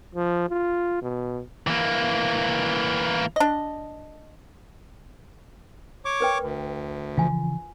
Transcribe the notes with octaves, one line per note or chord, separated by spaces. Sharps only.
F3
F4
B2
E3 A#3
D4 D#5
C#5 C#6 D6
A#4 B4 G5
D2
C#3 E3 F3 F4 G#5